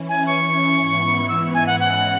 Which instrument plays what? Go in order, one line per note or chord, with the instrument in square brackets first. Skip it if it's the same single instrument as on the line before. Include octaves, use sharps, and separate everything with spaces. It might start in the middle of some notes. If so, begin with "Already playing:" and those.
Already playing: [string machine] E3 C#4 E4
[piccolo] G#5
C#6
[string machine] G#2 E3 B3 E4
[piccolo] E6
G#5
F#5
[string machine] E3 G#3 C#4 [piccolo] F#5